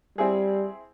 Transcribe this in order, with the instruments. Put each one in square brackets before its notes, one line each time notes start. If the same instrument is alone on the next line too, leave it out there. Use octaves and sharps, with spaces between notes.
[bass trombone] G3 [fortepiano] C4 E4 G#4